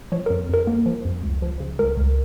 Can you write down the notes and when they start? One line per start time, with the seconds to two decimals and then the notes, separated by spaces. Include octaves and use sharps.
0.12 F3 C#5
0.26 F2 A#4
0.49 F2 A#4
0.67 A#3
0.86 F3
1.05 F2
1.23 C#2
1.42 F3
1.60 C#3
1.79 C#2 A#4
1.97 C#2